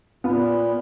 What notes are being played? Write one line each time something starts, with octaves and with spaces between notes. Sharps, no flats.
A#2 B3 F4